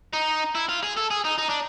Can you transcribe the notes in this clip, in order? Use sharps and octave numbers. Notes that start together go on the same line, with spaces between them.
D#4
E4
F4
G#4
A4
G#4
D#4
D#4
D4